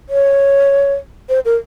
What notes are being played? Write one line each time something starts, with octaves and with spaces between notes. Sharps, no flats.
C#5
C5
A#4